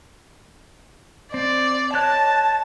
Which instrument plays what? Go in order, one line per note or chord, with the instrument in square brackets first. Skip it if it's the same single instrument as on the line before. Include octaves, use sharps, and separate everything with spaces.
[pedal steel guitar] C4 [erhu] D5
[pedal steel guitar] C#5 D#5 F#6 [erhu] A5